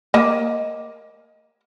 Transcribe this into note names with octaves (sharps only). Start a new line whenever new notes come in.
A#3 D#5